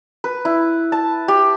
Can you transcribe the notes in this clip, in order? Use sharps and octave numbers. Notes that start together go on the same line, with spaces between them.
B4
E4
A5
G4